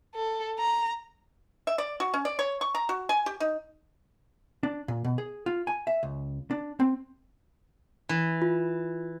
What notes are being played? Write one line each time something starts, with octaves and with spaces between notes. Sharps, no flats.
A4
A#5
E5
D5
F#4
C#4
D5
C#5
C#6
A#5
F#4
G#5
G4
D#4
D4
A#2
B2
G#4
F4
G#5
E5
C#2
D4
C4
E3
F4